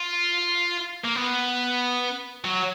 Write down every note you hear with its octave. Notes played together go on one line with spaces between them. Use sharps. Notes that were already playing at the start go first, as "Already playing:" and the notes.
Already playing: F4
A#3
B3
F#3